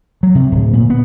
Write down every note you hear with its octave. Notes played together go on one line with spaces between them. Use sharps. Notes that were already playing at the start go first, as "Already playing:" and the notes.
F#3
C3
D1
A#2
B3